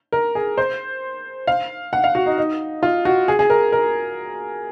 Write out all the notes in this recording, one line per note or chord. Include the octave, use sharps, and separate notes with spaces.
A#4
G#4
C5
F5
F#5
F5
F#4
D#4
D#4
F4
F#4
G#4
G#4
A#4
A#4